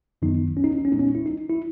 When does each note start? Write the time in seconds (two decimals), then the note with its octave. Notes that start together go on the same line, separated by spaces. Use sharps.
0.22 F#2 D#3 F#3 B3 D#4
0.57 C#4
0.64 D#4
0.71 C#4
0.78 D#4
0.85 C#4
0.92 A#2 G#3 B3 D#4
0.99 C#4
1.15 E4
1.26 D#4
1.50 E4